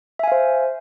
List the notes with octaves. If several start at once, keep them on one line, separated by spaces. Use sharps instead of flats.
C5 E5 F5 G#5